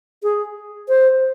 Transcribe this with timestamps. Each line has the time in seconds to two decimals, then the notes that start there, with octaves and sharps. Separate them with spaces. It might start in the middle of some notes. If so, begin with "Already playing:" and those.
0.23 G#4
0.89 C5